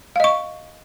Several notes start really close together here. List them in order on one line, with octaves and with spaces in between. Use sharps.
F5 D#5 C#6